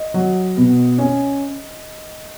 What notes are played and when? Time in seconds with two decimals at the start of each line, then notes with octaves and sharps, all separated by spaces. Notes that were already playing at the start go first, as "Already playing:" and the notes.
Already playing: D#5
0.14 F#3
0.57 B2
0.98 C#4